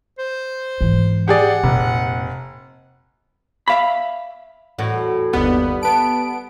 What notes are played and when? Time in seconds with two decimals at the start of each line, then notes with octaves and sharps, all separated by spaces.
0.18 C5
0.81 G#2 E3
1.28 G4 G#4 D5 F#5
1.63 F1 A#2
3.68 E5 F5 B5
4.78 E2 A2 F#4
5.33 G1 D#2 G3 B3
5.83 B3 A5 D7